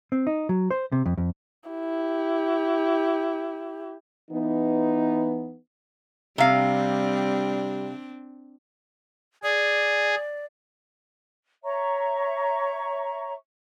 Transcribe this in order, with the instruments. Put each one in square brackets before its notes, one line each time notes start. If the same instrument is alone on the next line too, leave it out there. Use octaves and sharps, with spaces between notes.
[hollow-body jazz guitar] C4
D#4
F#3
C5
C3
F2
F2
[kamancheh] E4 G4
[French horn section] E3 B3 D#4
[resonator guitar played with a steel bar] C3 F5 [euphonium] G3 [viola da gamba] C4 D4
[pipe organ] G#4 [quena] D5
[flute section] C#5 E5 A#5 C#6